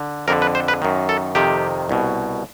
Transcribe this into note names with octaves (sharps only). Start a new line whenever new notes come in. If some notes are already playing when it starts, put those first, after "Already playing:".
Already playing: D3
F2 D3 A#4
B4
C5
B4
F#2 D#3
A4
F2 C3 D#3 G4
C2 B2